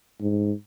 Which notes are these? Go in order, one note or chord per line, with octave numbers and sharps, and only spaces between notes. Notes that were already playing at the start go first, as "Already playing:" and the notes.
G#2